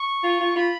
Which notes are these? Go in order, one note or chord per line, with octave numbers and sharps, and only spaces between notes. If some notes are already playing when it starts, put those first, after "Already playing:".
Already playing: C#6
F4
F4
F4 B5